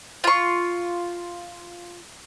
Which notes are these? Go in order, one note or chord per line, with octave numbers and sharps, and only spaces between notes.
F4 C#6